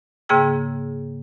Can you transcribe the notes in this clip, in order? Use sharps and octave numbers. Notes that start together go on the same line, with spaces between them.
G#2 C#3 A#3 G#4 G5 E6